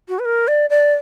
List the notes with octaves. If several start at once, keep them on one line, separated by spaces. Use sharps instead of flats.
F#4
B4
A#4
D5
D5